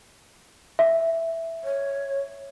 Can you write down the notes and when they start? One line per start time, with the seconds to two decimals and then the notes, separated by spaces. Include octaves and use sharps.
0.79 E5
1.64 C#5